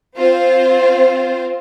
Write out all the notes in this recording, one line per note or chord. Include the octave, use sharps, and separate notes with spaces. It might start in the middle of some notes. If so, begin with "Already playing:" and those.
C4 F4 C5